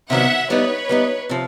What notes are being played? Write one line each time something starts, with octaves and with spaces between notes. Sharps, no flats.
C3 D#3 F#3 B3 E5 F#5
G3 B3 D#4 B4 C#5
G3 B3 D#4
C3 F3